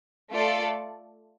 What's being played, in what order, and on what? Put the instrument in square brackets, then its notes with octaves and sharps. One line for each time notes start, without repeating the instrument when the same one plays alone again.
[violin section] A3 F4 A4 D5